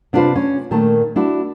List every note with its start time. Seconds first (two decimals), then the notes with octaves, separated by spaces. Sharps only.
0.13 C3 D4 E4 F4 B4 C5
0.35 C#4
0.71 A#2 D#3 A3 A5
1.16 D4 E4 F#4